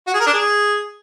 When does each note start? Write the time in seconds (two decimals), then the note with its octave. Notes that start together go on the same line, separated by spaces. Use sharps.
0.07 F#4
0.14 G#4
0.20 A#4
0.27 D4
0.33 G#4